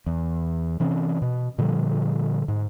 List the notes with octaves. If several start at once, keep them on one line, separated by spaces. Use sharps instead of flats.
E2
C3 E3 C4 C#4
B2
A#2 D3 F3 G3
G#2